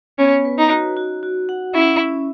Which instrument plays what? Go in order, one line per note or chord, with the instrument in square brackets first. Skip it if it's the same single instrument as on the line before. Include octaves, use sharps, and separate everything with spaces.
[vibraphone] B3 [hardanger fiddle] C#4
[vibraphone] B4
[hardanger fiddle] D#4
[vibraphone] F#4
F#4
F#4
F#5
[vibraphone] C#4 [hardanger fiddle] E4
[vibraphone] C#4